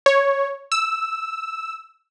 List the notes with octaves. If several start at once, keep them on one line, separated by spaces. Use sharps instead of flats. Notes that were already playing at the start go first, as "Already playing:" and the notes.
C#5
E6